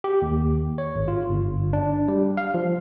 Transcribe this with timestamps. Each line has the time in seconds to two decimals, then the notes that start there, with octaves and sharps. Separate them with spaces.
0.04 G4
0.22 D#2
0.78 C#5
0.96 G#1
1.08 F4
1.29 G1
1.73 D4
2.08 G3
2.37 F5
2.54 F3